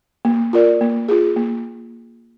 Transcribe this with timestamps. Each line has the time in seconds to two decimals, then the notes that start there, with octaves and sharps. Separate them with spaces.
0.25 A#3
0.53 F4 A#4 D5
0.81 A#3
1.09 F4 G#4
1.36 A#3